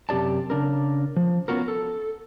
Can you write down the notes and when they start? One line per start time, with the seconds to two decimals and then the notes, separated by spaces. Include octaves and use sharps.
0.09 F#2 C3 G4 D5 A5
0.50 C#3 D4 A#4
1.17 F3
1.48 B3 C#4 F4 F#4 A#4
1.68 A4